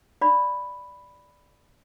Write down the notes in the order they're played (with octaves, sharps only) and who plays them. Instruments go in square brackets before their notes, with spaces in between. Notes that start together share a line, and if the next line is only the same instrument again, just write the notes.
[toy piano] D5 B5